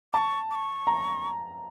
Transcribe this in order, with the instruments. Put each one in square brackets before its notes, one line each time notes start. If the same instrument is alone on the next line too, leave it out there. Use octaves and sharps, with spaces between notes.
[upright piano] A5 [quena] C#6 D6
[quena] D6
C#6
[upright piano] A#5